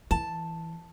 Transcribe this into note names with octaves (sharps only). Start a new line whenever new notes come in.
E3 A5